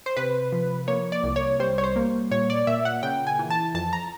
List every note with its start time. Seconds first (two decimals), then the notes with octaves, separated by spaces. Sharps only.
0.06 C5
0.17 C3 B4
0.52 F3
0.88 A#3 C#5
1.12 D5
1.24 C2
1.36 C#5
1.60 G3 C5
1.78 C#5
1.84 C5
1.96 A#3
2.31 A#2 C#5
2.50 D5
2.67 A#2 E5
2.85 F#5
3.03 C#3 G5
3.27 G#5
3.39 E3
3.50 A5
3.74 F2 A5
3.93 A#5